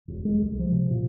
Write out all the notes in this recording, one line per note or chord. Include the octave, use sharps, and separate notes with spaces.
E1
G#3
C2
F3
C3
A#2